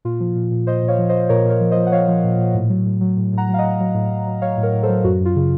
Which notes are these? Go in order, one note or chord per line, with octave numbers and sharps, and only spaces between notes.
A#2 F4
F3
A#2
A#2
A#2 C5 D#5
A#2
C#5 F5
F3
C5 D#5
F3
A#2 A#4 C#5
A#2
A#4 C#5
F3
C5 D#5
F3
F#5
F3 C#5 F5
F3
A#2
A#2
A2
F#3
A2
F#3
A2
A2 F#5 A#5
F#3
F5
D#5 F#5
A2
F#3
A2
A2
F#3
F#3 C#5 F5
A2
A#4 C#5
A2
A4 C5
F#3
F#2 F#4
F#2 F4
C#3